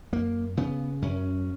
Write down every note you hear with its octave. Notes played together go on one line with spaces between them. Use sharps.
F#2 A#3
C#3 B3
F#2 C#4